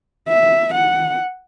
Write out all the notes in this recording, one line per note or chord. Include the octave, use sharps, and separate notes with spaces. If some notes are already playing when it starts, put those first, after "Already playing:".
E5
F#5